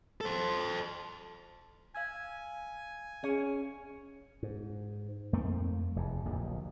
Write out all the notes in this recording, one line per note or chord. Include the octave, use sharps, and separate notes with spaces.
A4 C5
F5 G#5 E6 G#6
C#4 G#4
G#2
F2 A3 A#3 C4
F1 E2
D1 A#1 D#2